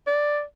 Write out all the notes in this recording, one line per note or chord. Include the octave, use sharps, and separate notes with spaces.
D5